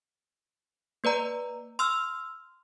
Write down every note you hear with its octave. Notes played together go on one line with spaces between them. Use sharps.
A#3 B4 D5 A#5
C6 E6 F6